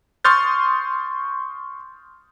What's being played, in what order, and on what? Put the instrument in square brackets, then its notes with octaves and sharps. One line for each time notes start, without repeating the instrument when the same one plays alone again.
[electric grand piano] C6 C#6 D#6 F6 G6 A6